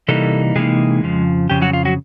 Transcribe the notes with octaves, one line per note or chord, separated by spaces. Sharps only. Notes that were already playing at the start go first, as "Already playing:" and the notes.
C3 E3 G3 A#3 D#4 A4
C3 E3 G#3 A#3 D#4 G#4
F2 C#3 F3
F2 C#3 G4
F#3 F#4
F4
F#3 F#4